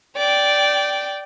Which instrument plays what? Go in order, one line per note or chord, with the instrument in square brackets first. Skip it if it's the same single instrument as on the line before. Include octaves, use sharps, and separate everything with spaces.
[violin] D5 G5